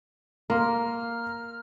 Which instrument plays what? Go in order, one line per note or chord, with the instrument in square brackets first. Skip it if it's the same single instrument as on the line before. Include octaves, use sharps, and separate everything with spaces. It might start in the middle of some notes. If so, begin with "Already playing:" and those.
[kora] A#3 [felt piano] A#5 C6 [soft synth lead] F6